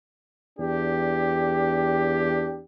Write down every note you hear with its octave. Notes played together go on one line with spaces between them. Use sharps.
E2 D4 G4